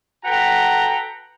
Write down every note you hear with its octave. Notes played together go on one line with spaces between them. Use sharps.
F#4 A4 B4 F#5 G5 A#5